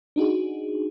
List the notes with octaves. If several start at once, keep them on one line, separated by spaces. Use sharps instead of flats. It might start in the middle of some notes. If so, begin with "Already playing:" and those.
D4 D#4 F#4 G#4